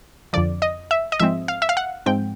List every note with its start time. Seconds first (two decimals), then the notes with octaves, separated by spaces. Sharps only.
0.33 F2 D3 F3 D5
0.62 D#5
0.91 E5
1.12 D#5
1.20 G#2 F3 G#3 C4 E5
1.48 F5
1.62 E5
1.69 F5
1.77 F#5
2.06 G#2 F3 G#3 C4 G5